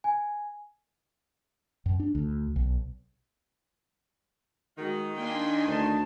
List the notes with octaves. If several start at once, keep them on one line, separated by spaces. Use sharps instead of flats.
G#5
F#2
D4
D2
B1
D#3 G#3 F#4
A#3 D4 G5 G#5 C6
D2 A5